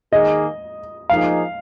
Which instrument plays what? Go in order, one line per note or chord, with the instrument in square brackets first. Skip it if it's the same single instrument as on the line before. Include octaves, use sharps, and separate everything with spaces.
[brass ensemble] D#3 A#3 G#4 [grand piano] D#5
[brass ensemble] F3 A#3 D#4 G#4 [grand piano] F5